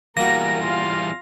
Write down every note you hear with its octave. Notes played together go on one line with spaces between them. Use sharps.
E2 G3 A#3 F#4 A#4 A#6
F4 F5